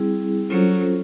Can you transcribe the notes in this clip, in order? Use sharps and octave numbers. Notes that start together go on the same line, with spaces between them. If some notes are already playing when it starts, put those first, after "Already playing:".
Already playing: G3 C4 E4 G#4
F#3 C#4 F4 A4 C5